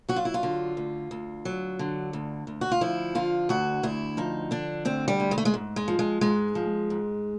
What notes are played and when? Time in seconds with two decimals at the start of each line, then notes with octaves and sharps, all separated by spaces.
0.09 F#3 F#4
0.16 F4
0.25 E4
0.34 F4
0.43 D3
0.77 D2
1.11 D2
1.45 F#3
1.79 D3
2.13 D2
2.47 D2
2.61 F#4
2.72 F4
2.81 F3 E4
3.15 D3 F4
3.49 D2 F#4
3.83 D2 E4
4.17 F3 D#4
4.51 D3 D4
4.85 D2 C4
5.08 G3
5.20 D2
5.31 G#3
5.38 A3
5.45 G#3
5.54 G#2
5.76 G#3
5.88 F3
5.99 G#3
6.21 G#2 G#3
6.55 F3
6.90 G#2